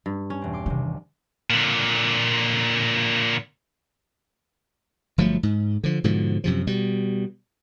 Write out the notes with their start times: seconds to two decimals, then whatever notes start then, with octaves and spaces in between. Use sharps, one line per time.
0.06 G2
0.30 C#4
0.42 E1 C4
0.53 C6 D6
0.66 C2 C3 D#3
1.50 A#2 D3
5.18 G1 F3 F#3 A3
5.43 G#2
5.84 D3 F3
6.04 G#2 B2 D3 F3
6.44 F#2 C3 F3
6.67 B2 G3